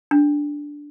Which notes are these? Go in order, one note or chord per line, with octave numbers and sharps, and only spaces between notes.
D4